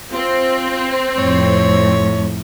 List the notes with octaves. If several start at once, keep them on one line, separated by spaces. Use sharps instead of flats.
C4 F4
F2 A2 C#5